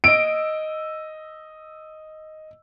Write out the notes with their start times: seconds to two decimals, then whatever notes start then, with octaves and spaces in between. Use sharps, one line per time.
0.04 D#5 E6 D7